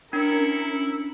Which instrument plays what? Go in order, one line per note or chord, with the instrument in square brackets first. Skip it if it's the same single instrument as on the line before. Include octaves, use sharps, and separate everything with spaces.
[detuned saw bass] C#4 [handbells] D4 [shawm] E4 [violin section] A#4 C#7